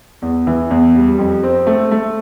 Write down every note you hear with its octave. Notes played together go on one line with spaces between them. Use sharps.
E2
E3
E2
G3
F2
C4
A3
A3